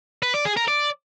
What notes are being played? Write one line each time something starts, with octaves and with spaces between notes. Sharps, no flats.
B4
D5
G#4
A#4
D5